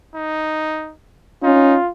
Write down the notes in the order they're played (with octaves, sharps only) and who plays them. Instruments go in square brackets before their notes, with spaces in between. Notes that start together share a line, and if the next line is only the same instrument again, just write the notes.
[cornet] D#4
[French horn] C#4 [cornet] D#4 [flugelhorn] F4